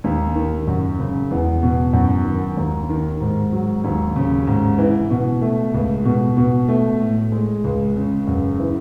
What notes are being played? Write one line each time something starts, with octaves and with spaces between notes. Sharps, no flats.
D#2
D#3
F#2
C#3
E2
B2
F#2
D#3
D#2
D#3
G#2
F#3
D#2
C#3
G#2
E3
B2
A3
C#2
B2
B2
A3
A2
G#3
C#2
C#3
F#2
E3